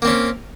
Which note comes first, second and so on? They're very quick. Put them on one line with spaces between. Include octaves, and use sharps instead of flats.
A#3 C4 C#4